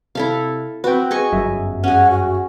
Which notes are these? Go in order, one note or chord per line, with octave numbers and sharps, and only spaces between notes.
C3 E4 A4 F5
C4 F#4 B4 G5
G#4 D#5 C#6
G1 F#2 E5
C#4 G#4 F#5
F#4